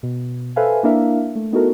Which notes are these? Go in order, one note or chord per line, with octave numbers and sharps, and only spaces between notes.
B2
A4 B4 C5 E5 F5 G#5
A#3 D4 E4 A#4 E5 F5
A3
B3 D#4 E4 F#4 A4 A#4